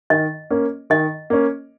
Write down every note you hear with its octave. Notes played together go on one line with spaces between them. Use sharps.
D#3 D#5
A#3 C#4
D#3 D#5
A#3 C#4